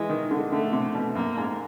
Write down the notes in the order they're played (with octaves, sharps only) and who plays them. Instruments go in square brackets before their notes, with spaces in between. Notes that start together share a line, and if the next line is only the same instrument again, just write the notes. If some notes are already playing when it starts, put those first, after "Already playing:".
Already playing: [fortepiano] E3 [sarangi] G#3
[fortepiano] D#3
D3
[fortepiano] D3 [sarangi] A3
[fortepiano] C3
B2
[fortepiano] F#2 [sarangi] A#3
[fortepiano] G#2